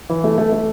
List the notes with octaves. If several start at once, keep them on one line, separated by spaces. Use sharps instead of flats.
E3
A3
A3
A3